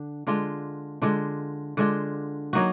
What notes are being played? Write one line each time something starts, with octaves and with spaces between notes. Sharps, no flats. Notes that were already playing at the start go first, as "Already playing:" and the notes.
Already playing: D3 D4
D3 G#3 D4 F4
D3 G#3 D4 F4
D3 G#3 D4 F4
F#3 A#3 D#4 F#4